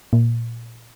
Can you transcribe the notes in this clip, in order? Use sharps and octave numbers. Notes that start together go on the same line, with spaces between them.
A#2